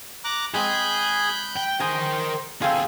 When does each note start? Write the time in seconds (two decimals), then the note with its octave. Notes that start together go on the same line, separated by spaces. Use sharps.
0.24 A#5 D6 F#6
0.54 G#3 C4 G#4 B5 F#6 G6
1.56 G5
1.80 G#4 A#4 C5 G5
2.62 D2 C4 F4 G#4 A4